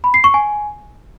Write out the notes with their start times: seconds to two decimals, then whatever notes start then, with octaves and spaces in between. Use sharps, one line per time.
0.04 B5
0.14 C7
0.24 C#6
0.34 G#5